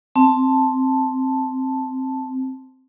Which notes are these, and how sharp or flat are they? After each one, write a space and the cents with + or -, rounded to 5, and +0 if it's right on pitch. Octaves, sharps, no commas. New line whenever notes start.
C4 +0 A5 +0